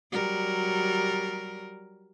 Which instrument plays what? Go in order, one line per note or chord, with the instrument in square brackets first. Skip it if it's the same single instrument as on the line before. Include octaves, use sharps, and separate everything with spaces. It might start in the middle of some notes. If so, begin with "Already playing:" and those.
[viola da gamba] F#3 G3 A#4